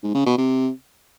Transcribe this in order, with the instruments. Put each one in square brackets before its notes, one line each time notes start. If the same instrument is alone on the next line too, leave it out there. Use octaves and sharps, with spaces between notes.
[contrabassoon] G#2
C#3
B2
C3